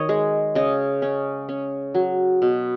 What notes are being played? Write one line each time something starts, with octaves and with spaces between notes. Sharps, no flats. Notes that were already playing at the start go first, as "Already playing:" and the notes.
Already playing: D#3 C#5 D#5
G#3
C#3 D#5
C#4
C#4
F#3
B2